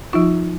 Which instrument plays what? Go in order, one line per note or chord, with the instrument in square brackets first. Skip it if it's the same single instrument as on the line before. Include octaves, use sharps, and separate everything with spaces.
[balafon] F3 D#4 F4